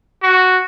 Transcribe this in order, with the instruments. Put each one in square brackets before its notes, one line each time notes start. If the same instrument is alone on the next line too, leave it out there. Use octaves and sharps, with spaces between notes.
[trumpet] F#4